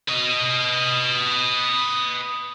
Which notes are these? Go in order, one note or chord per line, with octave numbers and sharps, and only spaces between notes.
B4 D#5